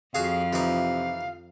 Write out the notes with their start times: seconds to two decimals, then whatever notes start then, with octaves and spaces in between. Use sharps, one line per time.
0.15 F2 F3 F#4 G#4 F5
0.53 C3 E3 D#4